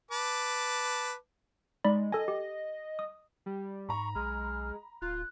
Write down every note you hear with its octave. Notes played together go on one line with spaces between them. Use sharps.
B4 A5 D6
G#3 D#4 D5 B5
A4 D#5 G#5
G4
D#6
G3
G#2 A#5 B5 C#6
B1 G#3 F6
D1 F4 F#6